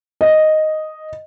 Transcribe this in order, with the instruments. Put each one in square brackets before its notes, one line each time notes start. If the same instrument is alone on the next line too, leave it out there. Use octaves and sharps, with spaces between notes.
[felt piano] D#5